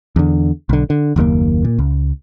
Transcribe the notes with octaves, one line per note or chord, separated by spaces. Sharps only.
E2 D3
B1 D3
D3
F#1 D#2 B2 A#3
A#2
C#2